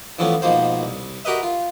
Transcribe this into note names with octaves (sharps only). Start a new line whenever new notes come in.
E3 F3 A3 B3 C#4
G#2 B2 F3 A#3 C5
C2
F#4 G4 A#4 B4 D#5 E5
F4